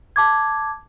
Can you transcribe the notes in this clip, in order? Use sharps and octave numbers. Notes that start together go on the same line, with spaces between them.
A5 D6 G#6